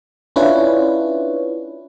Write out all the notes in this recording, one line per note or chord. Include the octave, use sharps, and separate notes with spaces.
C#4 D4 E4 F4 B4 C#5